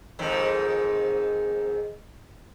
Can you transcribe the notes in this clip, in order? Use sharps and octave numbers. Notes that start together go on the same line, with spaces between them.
F2 G#2 D#3